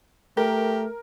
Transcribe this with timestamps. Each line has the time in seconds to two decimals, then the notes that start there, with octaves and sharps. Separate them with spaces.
0.37 A3 G4 A#4